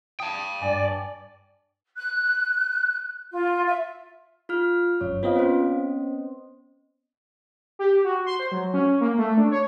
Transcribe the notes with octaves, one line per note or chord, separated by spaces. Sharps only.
G5 A5 D#6
G2 D5 G#5
F#6
F4
E5
F4 F6
G1 F#2 C#5
B3 C4 F4 D#5 F5
C#4 C5
G4
F#4
C6
C5
F#3
C#4
A#3
A3
D4
C#5